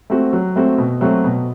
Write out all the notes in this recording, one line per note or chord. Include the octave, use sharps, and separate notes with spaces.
A3 C4 F#4
F#3
A3 C4 F#4
B2
F#3 A3 C4 F#4
B2